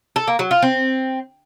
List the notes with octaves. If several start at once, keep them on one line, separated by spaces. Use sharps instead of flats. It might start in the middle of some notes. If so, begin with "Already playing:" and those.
A4
A#3
F#3
F4
C4